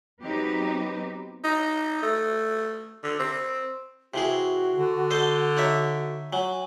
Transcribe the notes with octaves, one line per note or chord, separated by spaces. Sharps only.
F#3 B3 C4 D#4 G4 B4
D#4
A3
D3
C4
C3 E3 F#4 G#4
D3
A4 C5 D#5
D#4 C#5 E5
F#3 G#5